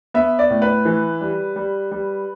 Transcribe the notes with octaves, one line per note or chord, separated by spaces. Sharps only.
B3 E5
D5
A2
B4
E3
G3
G3
G3